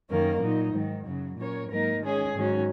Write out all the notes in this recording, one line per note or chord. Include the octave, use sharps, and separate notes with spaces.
F#2 D#3 A#3 C#4 A#4
A#2 F#3 D#4
G#2 D#3 F#3
F#2 C#3 F#3
A#2 F#3 C#4 A#4 C#5
G#2 F#3 A#3 D#4 A#4
D#3 G#3 C#4 G#4
G#2 D#3 F#3 C#4